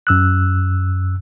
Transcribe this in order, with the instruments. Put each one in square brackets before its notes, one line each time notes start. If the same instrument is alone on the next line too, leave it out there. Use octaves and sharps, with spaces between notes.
[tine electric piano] F#2 E6 F#6